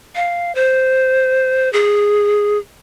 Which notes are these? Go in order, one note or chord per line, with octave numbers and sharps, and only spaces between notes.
F5
C5
G#4